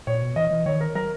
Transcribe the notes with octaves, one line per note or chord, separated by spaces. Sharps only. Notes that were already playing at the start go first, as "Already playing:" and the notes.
A#2 C#5
B2
E3 D#5
E3
D#3 C#5
A#4
F#3 A#4